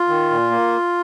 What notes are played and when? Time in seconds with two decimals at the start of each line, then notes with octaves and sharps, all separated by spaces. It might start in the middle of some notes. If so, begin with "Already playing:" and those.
Already playing: F4
0.08 D#3
0.31 A#2
0.51 A#3